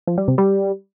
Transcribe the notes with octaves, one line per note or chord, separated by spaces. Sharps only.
F3
G3
C3
G3